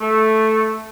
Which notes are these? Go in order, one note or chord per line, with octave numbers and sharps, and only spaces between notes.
A3